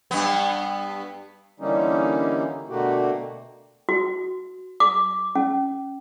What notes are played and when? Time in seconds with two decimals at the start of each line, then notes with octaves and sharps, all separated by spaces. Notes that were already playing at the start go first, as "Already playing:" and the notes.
0.11 G2 B3
1.60 D3 E3 G3 A#3 C#4 D#4
2.69 B2 D3 A3 A#3 F#4 G4
3.89 F#4
4.80 D6
5.35 C#4